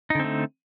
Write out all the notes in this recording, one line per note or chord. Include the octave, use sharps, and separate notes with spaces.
D3 A3 C4 D#4